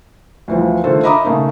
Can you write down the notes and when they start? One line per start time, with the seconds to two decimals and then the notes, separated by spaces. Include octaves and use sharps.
0.48 D2 E3 F3
0.84 D3 D#3 A3 F4 A4 C5
1.03 D#5 E5 A#5 B5 D6 D#6
1.25 C#3 A3 A#3 D#4